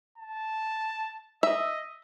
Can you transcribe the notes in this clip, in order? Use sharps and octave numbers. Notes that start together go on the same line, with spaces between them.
A5
D#5 E5